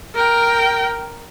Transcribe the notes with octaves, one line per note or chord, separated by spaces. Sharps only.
A#4 G5